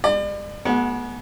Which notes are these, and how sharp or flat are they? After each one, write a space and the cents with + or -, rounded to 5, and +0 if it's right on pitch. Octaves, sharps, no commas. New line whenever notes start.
G#3 -45 D5 +40
G#3 +30 B3 -30 F#4 +0